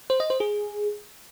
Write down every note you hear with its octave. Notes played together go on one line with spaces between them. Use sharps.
C5
D#5
C5
G#4